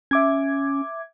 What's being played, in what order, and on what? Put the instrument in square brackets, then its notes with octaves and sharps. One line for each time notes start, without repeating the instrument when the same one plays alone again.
[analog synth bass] C#4 [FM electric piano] E5 D6 G#6